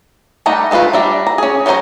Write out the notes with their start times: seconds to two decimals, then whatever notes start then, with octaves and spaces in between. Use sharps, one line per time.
0.46 G3 A3 D#4 F#5 A#5
0.71 G#3 A3 B3 F4 B4
0.93 G3 D4 E5 A#5
1.27 A#5
1.38 C#4 G#4
1.66 F#3 C#4 A#4 C5 A#5